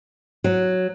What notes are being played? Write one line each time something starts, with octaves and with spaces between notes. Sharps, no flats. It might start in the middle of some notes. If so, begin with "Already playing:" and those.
F#3